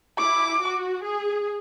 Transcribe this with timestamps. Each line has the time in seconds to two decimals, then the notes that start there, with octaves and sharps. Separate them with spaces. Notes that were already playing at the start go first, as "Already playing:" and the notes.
0.18 E4 D6
0.60 F#4
1.03 G#4